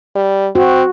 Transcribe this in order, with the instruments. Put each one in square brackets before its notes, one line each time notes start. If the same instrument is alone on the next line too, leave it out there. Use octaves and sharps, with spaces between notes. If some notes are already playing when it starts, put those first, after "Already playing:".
[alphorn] G3
[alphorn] C4 [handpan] F#4